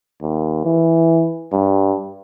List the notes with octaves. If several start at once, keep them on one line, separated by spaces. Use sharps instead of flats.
D#2
E3
G2